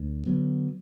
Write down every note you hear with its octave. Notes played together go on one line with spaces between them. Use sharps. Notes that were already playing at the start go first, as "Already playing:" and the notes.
Already playing: D2
D3 F#3 B3